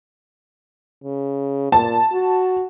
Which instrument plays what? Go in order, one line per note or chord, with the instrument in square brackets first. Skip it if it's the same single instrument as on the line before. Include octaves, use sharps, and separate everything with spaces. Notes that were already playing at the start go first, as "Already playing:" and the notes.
[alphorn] C#3
[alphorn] A#2 [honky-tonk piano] A5
[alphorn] F#4